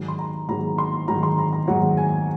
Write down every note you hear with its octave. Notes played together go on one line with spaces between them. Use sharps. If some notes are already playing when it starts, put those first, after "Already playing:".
Already playing: G#2 D#3 F#3
C6
A#5
G#2 D#3 F#3 A#5
C6
G#2 D#3 F#3 A#5
C6
A#5
A#5
G#2 D#3 F#3 F#5
G#5